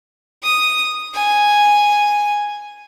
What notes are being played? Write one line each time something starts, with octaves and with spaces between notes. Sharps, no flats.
D#6
G#5